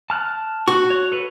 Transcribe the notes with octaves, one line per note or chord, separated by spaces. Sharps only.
A5 F6 F#6
F#4 C#6
C#5
A4 B4